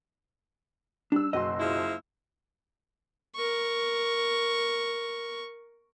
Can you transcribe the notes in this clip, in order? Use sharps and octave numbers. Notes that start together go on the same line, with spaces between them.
G3 D4 E6
F#1 B1 F#4 D#5 C6
F3 G#3 E4
A#4 C#6